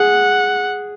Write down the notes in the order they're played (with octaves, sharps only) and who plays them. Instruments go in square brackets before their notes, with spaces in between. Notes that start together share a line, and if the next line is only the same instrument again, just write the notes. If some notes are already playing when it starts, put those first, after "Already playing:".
Already playing: [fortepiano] G#4 [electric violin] F#5